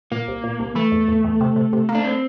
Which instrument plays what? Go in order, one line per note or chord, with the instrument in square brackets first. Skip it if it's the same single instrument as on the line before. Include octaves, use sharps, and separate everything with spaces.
[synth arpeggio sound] A#2 [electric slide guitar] A#3
[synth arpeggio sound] C2
A#2
C2
[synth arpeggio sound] E3 [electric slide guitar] A3
[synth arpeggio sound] E2
E2
E2
C3
C3
C3
A#3
[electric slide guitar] D4
C4